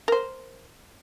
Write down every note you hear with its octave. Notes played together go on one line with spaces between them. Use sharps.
A#4 C5